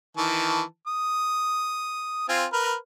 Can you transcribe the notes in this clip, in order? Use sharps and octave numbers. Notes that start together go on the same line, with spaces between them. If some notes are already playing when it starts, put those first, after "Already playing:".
D#3 E3 A5
D#6
C4 F4 G#5
A#4 B4 F6